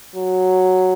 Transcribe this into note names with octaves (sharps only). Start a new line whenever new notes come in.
F#3